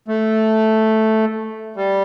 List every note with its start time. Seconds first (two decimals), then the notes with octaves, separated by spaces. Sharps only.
0.08 A3
1.76 G3